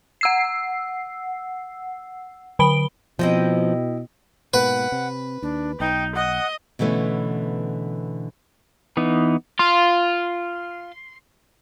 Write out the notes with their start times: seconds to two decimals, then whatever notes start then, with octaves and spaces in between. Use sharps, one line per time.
0.21 F#5 E6 C7
2.59 D3 B5 D7 G7
3.19 B2 F3 C4 E4 D#5 G5
4.54 G#2 B2 A#3 B4 F#5
4.92 C3 C4
5.42 D#2 D4
5.80 B1 D#4 G5
6.15 D#5 F#5
6.79 B2 D3 E3 A3 C#4
8.97 E3 B3 D#4
9.59 F4 C6